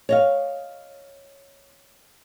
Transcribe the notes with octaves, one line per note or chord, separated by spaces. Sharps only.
C#5 D#5 F5